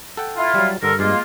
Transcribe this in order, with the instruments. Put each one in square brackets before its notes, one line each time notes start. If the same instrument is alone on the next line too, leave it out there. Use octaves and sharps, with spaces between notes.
[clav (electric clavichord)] A4 F#5 G5
[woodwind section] E4 F4
[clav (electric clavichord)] F#3 G3
[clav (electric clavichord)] G2 [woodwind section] D3 A4 A#4
[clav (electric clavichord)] G2 G#4 [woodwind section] G#3 A#3 F4